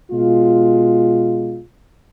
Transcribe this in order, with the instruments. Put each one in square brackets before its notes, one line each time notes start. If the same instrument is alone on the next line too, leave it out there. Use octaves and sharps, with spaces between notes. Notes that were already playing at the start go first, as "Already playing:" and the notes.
[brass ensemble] B2 G#3 F4